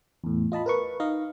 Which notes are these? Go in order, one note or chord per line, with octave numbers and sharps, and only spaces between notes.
E2 A2
F4 D#5 A5 B5
A#4 B4 C#6
D#4 D#5 F5